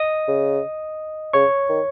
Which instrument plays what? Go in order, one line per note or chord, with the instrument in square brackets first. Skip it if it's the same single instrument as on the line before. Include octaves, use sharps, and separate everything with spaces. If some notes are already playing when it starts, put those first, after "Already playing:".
Already playing: [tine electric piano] D#5 D#6
[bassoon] C#3
[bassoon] C#3 [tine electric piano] C#5 C#6
[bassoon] D#3